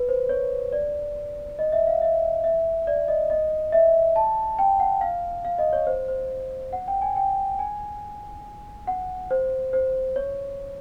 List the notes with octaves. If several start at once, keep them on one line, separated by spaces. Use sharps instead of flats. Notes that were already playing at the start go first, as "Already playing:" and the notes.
Already playing: B4
C5
C#5
D5
D#5
E5
F5
E5
E5
D5
D#5
D#5
E5
A5
G5
F#5
F5
F5
D#5
C#5
C5
C5
F#5
G5
G#5
G5
G#5
F#5
C5
C5
C#5